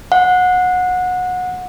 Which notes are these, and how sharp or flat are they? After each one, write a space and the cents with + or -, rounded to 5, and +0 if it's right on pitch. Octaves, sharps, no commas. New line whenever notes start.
F#5 -25